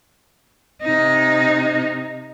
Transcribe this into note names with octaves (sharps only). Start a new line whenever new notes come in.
C3 D#4